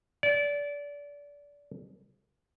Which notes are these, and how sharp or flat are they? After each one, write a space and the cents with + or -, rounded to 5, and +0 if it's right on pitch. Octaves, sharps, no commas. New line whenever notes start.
D5 -25